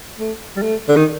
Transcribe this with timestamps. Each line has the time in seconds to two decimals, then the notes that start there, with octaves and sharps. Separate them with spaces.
0.19 A3
0.56 G3
0.62 A3
0.89 D3
0.96 D#3